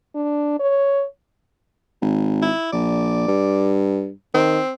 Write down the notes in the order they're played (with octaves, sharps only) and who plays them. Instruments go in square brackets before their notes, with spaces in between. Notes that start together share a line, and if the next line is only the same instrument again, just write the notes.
[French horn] D4
C#5
[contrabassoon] G#1
[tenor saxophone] E4
[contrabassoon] A#1 [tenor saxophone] D5
[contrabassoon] G2
[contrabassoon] D#3 [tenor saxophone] C4